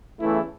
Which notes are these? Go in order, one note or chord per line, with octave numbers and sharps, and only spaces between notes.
E2 C#3 E3 A3 E4